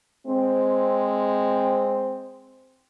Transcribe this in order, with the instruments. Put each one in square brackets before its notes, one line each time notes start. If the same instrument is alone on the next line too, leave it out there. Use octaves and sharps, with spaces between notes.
[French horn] G#3 [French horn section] C4